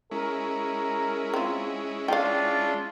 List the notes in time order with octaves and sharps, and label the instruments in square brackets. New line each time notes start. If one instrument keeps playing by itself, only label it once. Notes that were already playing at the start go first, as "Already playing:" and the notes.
[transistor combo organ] G#3 C#4 E4 [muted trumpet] A#4
[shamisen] C4 F4
[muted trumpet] D4 [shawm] F4 [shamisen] F5 G5